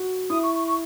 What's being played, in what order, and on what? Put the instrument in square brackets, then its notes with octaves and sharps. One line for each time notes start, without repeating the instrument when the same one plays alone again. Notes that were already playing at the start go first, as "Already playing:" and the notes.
Already playing: [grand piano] F#4
[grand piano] E4 [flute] D#6
[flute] C#6
C#6
C#6